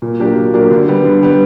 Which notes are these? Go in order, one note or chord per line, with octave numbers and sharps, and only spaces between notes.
A#2
F#3 A#3 D4 G4
A#2
F#3 A#3 D4 G4
D3
G3 B3
D3
G3 B3